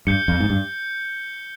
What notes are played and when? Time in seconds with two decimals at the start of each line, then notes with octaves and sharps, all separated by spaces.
0.07 G2 G6 C#7 G7
0.28 F2
0.40 G#2
0.50 G2